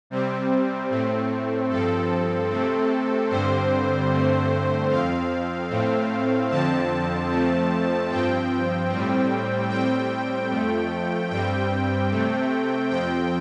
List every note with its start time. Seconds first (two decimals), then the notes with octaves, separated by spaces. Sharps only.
0.10 C3 G3 C4
0.90 A2 A3 C4
1.69 G2 F3 C4 A4
2.50 C3 A3 C4
3.30 G2 D3 G3 C4 C5
4.09 G2 D3 A3 C4
4.90 F2 F3 C4 F5
5.70 A2 A3 C4
6.50 F2 D3 F3 C4 A5
7.30 F2 F3 A3 C4
8.10 G2 F3 C4 G5
8.90 A2 G3 C4
9.70 A2 G3 C4 G5
10.50 F2 F3 A3
11.30 G2 G3 C4 G5
12.10 C3 A3 C4
12.90 F2 F3 C4 G5